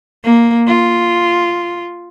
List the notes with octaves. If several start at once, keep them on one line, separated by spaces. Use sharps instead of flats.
A#3
F4